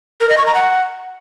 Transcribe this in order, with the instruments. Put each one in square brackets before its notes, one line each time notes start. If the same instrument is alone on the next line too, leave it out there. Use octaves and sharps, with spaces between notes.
[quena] A#4
D#5
C#6
A#5
F#5